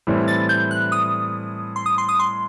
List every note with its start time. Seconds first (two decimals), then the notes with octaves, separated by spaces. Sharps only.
0.07 A2 E3 G3 C4 E4
0.28 A6
0.49 G6
0.71 F#6
0.92 D#6
1.76 C6
1.86 D#6
1.98 C6
2.09 D#6
2.19 C6